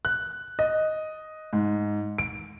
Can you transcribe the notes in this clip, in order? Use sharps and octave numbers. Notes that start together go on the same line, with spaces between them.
F#6
D#5
G#2
D7